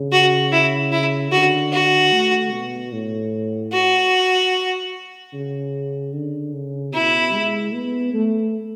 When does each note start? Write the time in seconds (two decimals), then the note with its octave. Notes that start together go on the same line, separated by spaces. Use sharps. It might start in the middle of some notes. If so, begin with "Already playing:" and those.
Already playing: C#3
0.12 F#4
0.52 E4
0.92 E4
1.32 D3 F#4
1.72 F#4
2.12 A3
2.52 B2
2.93 A2
3.73 F#4
5.33 C#3
6.13 D3
6.54 C#3
6.93 B2 E4
7.34 G#3
7.74 B3
8.14 A3